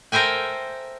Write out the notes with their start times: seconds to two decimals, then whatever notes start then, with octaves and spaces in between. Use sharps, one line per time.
0.12 A4 A#4 C5 E5 G5 G#5